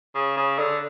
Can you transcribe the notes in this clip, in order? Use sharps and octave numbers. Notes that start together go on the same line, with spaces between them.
C#3
C#3
D3